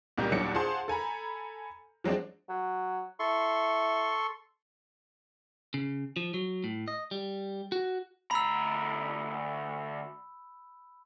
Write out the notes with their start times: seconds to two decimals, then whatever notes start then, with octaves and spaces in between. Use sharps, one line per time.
0.18 C#2 A#2 G3 A#4 G6
0.31 D#2 A#2 F#3 D4 C#7
0.54 F4 G#4 C5 F#5 A5 C6
0.88 A4 G#5 A#5 B5
2.04 F3 F#3 G#3 C4 D4
2.49 F#3
3.20 E4 A4 C6 C#6
5.74 C#3
6.16 F3
6.34 F#3
6.64 A2
6.88 D#5
7.11 G3
7.72 F#4
8.31 D2 A#5 B5 E6